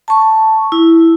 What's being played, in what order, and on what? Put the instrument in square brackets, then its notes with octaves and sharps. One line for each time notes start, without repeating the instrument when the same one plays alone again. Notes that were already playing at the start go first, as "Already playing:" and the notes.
[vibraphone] A5 C#6
E4